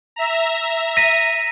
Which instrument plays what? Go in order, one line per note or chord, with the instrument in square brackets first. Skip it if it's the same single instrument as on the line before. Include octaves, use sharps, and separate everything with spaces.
[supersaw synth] E5 A#5
[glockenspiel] A#6 B6 D#7